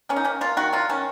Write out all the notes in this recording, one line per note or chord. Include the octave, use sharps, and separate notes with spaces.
A#3 C#4
D#4
A#3 C#4
A#3 F4
D#3 F#4
F#3 F4
D#3 C#4